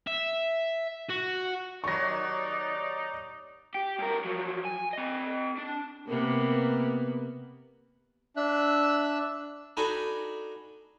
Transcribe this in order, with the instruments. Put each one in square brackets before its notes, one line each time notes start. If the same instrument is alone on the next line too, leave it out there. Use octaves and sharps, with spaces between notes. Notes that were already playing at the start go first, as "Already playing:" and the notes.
[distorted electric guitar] E5
F#4
[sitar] D#2 F#3 [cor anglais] D#4 [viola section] D5 [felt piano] C#6 A#6
[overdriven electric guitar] G4
G2 A#4
F3 F#3
G#5
C4 D#5
D4
[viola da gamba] C3 [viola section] A#3 B3
[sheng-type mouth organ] D4 E5 E6 F#6
[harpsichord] D4 D#4 F#4 A4 G#5 B5